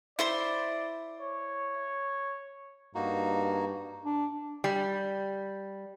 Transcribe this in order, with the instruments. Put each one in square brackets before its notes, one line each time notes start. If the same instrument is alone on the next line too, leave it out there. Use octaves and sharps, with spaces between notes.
[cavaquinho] E4 C5 C6 [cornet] D5
[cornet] C#5
[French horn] G2 [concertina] A#3 D#4 F#4
[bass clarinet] D4
[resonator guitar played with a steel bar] G3